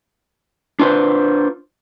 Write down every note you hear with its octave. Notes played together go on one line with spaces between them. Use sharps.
D4 F4 B4 C5